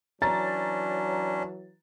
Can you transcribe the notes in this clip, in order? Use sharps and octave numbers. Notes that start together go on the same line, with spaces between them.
E3 F#3 C#4 D4 A#5 A6